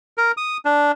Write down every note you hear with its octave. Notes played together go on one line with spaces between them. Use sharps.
A#4
D#6
D4